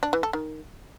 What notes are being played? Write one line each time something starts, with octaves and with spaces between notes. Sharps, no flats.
D4
E3
A4
D#3